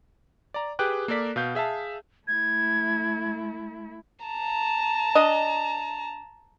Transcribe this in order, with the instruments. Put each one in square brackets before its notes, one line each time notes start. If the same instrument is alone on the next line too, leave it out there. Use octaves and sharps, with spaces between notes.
[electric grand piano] D5 A#5
G4 G#4 B4 G5 D6 F#6
A#3 A4 A#4 D5 B6
B2 F5 G6
G#4 E5 F5 A5
[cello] A3 E4 [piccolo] G#6
[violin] A5 A#5
[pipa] D4 D#5